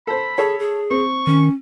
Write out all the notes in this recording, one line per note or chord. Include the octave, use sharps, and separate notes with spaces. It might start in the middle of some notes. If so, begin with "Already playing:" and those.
A4 C5 B5
G#4 A4 C#5
G#4
C4 C#6
D#3 C#4